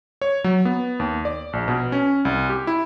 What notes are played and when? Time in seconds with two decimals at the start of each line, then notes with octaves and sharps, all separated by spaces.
0.22 C#5
0.44 F#3
0.65 B3
1.00 D#2
1.25 D5
1.53 A#1
1.68 B2
1.92 C#4
2.25 C2
2.50 G4
2.67 E4